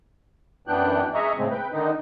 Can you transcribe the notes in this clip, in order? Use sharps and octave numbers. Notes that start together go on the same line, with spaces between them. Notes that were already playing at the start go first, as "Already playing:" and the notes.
F#2 E3 B3 D4 G5 F#6
G#3 G#4 D#5 E5 A#5 C#6
A2 C#3 G#3 A3 C4
B4 G5
D3 D#3 D#4